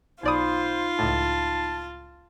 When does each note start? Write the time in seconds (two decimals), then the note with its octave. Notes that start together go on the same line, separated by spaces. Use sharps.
0.23 B1 D#4 F4 C5 D5 B5 D#6
0.99 C#2 A2 A5